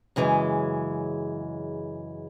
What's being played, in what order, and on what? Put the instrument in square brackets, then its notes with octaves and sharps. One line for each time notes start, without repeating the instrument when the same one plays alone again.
[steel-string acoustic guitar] F#2 C#3 E3 G#3